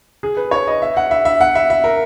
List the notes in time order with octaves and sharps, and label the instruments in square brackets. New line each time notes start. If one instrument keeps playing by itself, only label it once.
[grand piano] G#4
B4
C#5
D#5
E5
F#5
E5
E5
F#5
E5
E5
A#4